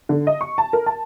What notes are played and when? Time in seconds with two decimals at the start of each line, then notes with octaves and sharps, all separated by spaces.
0.09 D3
0.27 D#5
0.41 C#6
0.58 A5
0.73 A#4
0.86 A5